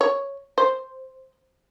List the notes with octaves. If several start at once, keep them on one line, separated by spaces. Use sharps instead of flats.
C#5
C5